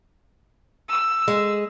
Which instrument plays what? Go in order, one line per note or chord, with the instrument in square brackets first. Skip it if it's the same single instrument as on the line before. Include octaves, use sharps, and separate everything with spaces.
[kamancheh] E6
[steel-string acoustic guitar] G#3